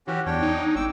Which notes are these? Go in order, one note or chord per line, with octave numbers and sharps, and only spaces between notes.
E3 C#4 F#4 G4
E2 D4 C#5 G5
D#4
G#1 G5 D6 E6